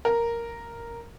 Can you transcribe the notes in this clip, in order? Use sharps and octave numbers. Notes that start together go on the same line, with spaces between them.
A#4